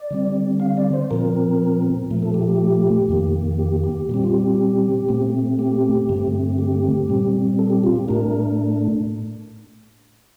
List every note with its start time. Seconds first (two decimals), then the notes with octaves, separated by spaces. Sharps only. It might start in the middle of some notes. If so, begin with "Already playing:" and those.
Already playing: D5
0.11 D3 G3 C4
0.60 F5
0.77 D5
0.93 C5
1.11 A#2 F3 C4 A#4
2.10 A#2 F3 A3
2.23 A4
2.34 G4
2.48 G4
3.09 F2 D#3 A#3
3.59 G4
3.84 G4
4.09 A#2 G3 C4 G4
4.24 F4
4.34 G4
5.09 A#2 A3 C4
5.59 G4
6.09 G2 D3 A3 C4
6.58 G4
7.08 A#2 G3 C4
7.59 A4
7.70 G4
7.84 F4
7.96 G4
8.08 A2 A3 D4 A#4